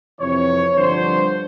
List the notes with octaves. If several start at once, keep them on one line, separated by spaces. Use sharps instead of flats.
F2 C3 E3 C#5
G2 D3 F3 C5